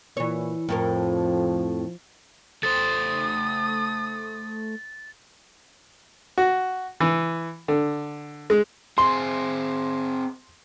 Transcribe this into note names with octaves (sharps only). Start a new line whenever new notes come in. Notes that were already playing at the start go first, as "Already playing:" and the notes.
A#2 E3 C#5
F2 A2 F3 A#4
A3 C5 D#6 A6
F#4
E3
D3
G#3
C4 G#4 C6